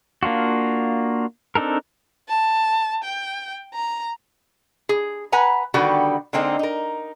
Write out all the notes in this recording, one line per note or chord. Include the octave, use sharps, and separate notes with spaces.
A#3 D4 F4 F#4
C4 D4 D#4 A4 A#4
A5
G5
A#5
G#4
B4 F#5 G#5 A#5
D3 D#3 G3 B3 F#4 G4
D3 G#3 A#3 C4 D#4
D#4 A#4